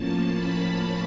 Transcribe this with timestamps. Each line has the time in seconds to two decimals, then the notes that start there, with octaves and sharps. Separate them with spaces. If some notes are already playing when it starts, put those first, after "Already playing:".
Already playing: A2 F3 A#3 C#4 A5
0.32 B5